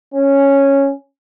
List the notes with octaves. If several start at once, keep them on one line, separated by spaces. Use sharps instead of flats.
C#4